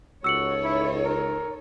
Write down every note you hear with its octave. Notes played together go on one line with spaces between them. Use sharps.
C#2 D#4 F#4 A4 C#5 E6 C#7 F#7
E4
A#4